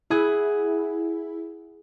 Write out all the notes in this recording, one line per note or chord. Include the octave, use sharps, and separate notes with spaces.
E4 G#4 F#5